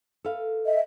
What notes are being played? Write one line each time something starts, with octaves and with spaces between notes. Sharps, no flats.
A4 B4 F5
D#5 E5